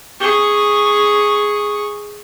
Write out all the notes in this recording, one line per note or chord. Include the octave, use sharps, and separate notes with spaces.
G#4 C#6